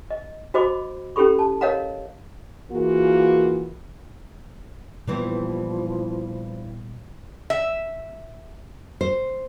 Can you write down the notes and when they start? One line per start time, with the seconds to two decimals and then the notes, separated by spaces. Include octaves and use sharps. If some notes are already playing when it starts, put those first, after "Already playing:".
0.10 D#5
0.54 F#4 C5 D#5 B5 D6
1.16 C#4 E4 G4 A4 B5 C#6
1.39 A5
1.61 A#4 C#5 D#5 F5 F#5 A#5
2.71 E3 A#3 F4 F#4 G#4 A#4
5.07 G2 A#2 E3 F3 G3 B3 C4
7.50 E5
9.01 C5